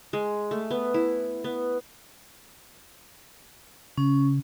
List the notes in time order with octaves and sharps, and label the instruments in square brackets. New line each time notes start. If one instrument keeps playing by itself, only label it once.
[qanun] G#3
A3
B3
E4
B3
[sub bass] C#3 [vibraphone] C#4